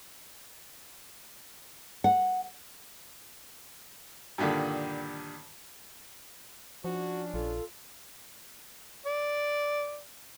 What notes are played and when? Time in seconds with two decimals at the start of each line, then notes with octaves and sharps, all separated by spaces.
2.04 F#5
4.38 G2 A#2 D3 D#3 G3
6.84 F3 C#4 D4 F#4
7.34 A#1 F4 A4
9.06 D5